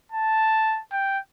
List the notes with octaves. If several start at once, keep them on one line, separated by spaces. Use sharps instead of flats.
A5
G5